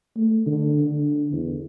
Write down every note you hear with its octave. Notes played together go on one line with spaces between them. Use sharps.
A3
D3
D3
E2